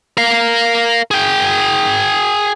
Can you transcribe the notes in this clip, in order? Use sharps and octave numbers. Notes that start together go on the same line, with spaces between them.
A#4 F5
G#4 G5